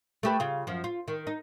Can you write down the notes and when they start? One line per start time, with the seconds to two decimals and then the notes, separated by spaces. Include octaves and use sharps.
0.23 A3 G4 B4
0.40 C#3 F4
0.67 F#2 F3
0.84 F4
1.08 D#3
1.27 D#4